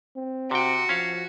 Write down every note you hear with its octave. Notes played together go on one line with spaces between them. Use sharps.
C4
C3 F#4 G5
F3 C#4 F5